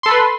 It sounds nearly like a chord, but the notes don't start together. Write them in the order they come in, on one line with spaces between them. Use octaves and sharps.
C6 A4 B5 B4